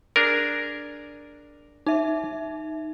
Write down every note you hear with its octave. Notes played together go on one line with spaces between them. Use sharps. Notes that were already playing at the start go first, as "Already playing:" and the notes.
D4 G#4 A#4
D#4 E5